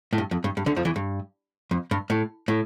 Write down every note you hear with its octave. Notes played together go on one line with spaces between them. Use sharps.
A2
G2
F2
G2
G2
D2 D3
F2 F3
E2 E3
G2
F2
G2
A2
A2